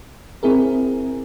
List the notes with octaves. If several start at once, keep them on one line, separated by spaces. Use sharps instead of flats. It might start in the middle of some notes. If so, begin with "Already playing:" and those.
C4 E4 G#4 A#4